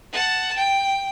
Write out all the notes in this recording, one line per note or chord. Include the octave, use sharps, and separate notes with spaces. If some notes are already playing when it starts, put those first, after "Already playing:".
F#5 A5
G5